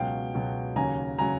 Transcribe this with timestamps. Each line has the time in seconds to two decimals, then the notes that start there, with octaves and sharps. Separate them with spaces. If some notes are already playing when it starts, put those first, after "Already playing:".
Already playing: C#2 B2 F#3 F5 G5
0.34 C#2 B2 F#3
0.76 D#2 C#3 F#3 G#5 A#5
1.19 C#3 F#3 G#5 A#5